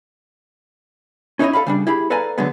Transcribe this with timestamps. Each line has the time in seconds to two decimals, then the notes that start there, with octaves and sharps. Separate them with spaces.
1.39 C#4 D#4 E4 C5 C#5 D#5
1.53 A4 D5 F5 B5
1.67 C#3 G3 D4
1.87 E4 G4 G#4 B5
2.10 A4 B4 D5 F5 G#5 A#5
2.38 D3 F#3 G#3 B3